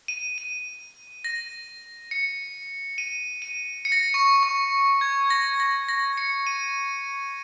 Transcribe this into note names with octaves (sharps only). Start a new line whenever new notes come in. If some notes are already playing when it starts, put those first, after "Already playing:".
D#7
D#7
A#6
C#7
D#7
D#7
C#7
A#6
C#7
C#6
C#6
G#6
A#6
A#6
A#6
C#7
D#7